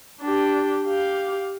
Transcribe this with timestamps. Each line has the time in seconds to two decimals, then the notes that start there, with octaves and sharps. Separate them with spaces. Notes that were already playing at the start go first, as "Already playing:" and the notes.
0.21 D4 G4
0.84 G4 F5